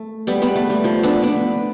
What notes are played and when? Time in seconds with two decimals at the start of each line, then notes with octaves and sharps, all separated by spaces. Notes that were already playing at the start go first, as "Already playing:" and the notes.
Already playing: A3
0.27 G3 B3
0.42 G3 B3
0.55 A3
0.70 G3
0.84 F3
1.03 B3 D4
1.23 B3 D4